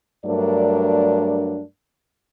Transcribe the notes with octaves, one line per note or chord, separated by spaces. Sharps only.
G2 F#3 A3 D4 A#4 D5